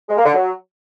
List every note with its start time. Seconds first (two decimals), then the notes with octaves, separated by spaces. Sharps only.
0.09 G#3
0.17 A#3
0.26 D3
0.34 F#3